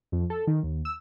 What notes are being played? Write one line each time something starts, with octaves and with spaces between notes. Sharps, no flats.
F2
A4
D#3
D#2
E6